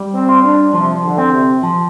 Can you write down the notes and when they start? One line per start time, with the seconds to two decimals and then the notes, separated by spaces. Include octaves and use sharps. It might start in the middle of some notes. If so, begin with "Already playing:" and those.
Already playing: G3
0.13 C4
0.29 F4
0.43 D4
0.74 C3 F3
1.04 D3
1.18 C4
1.33 C3
1.63 F3